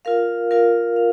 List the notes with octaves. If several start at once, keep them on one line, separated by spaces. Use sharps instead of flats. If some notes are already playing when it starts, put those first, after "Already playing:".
F4 A#4 F5
F4 A#4 F5
F5